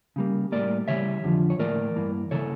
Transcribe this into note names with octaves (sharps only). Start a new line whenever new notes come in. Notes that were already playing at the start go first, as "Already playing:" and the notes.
C#3 G3 A#3
A2 G3 A#3 A#4 D5
C#3 E3 G3 C#5 E5
F2 D3 F3
C#5
A2 E3 A#3 A#4 D5
G2 E3 A#3
C#3 E3 A#3 A4 C#5